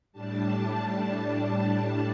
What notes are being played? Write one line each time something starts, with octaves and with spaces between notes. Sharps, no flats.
A2 G3 D4 A5
A5